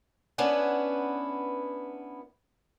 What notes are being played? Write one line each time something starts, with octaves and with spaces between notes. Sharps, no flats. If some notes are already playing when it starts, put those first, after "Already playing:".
B3 C#4 D4 E4 B4 F#5